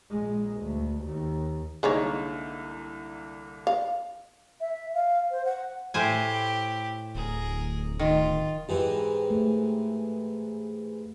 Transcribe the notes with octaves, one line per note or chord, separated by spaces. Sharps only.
A#1 G#3
D2
D#2
C2 D3 G#3 A#3 D#4 C#5
F5
E5
F5
C5
F#5
A2 E4 G4 C5 G#5
D1 G#4 A#4
D#3 F4
G#2 E3 G4
A3